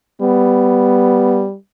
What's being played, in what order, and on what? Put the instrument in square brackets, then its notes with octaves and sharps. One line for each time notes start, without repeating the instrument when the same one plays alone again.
[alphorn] G3 [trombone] B3